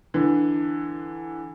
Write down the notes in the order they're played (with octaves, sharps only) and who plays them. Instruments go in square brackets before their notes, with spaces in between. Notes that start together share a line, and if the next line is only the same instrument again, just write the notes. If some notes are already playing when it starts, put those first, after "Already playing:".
[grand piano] D3 E3